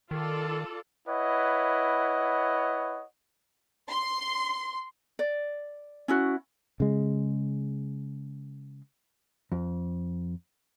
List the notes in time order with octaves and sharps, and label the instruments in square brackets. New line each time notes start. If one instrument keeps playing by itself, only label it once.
[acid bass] D#3 [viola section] F4 A4 D5
[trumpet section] E4 B4 C#5 D#5 F#5
[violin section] C6
[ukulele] D5
C#4 E4 F#4
[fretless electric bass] C#3 G#3
[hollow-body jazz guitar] F2